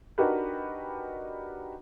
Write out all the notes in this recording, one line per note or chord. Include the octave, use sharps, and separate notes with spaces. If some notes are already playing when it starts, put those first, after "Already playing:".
D4 D#4 F#4 G4 A#4 B4